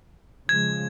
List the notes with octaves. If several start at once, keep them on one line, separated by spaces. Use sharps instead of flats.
C#3 F3 G#3 G#6